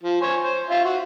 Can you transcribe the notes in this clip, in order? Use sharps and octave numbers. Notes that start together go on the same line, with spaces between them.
F3
C5 C#5 G#5
C5
F4 E5
F#4